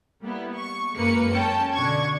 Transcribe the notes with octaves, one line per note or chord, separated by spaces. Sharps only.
G3 A#3 B3 E4
C#6
F#2 G#3 A#3 A#4 B4 C#7
C#4 G5 A5
B2 D3 D4 C#6 G#6